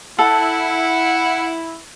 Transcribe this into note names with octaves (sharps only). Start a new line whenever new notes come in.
E4 A4 F#5